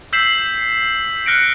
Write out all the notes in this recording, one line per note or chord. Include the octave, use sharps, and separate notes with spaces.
E6 G6 B6 C7 E7 F#7
F6 F#6 A#6 C#7 D7